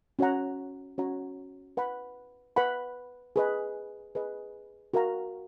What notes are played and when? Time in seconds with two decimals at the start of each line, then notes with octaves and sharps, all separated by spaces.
0.19 C#4 F#4 C#5 F#5 A#5
0.98 C#4 F#4 C#5 F#5 A#5
1.77 B4 F#5 B5
2.56 B4 F#5 B5
3.36 G#4 B4 D#5
4.15 G#4 B4 D#5
4.94 F#4 A#4 F5 A#5